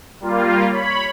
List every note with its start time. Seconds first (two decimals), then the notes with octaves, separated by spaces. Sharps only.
0.20 G3 A#3 F4
0.70 C#5 B5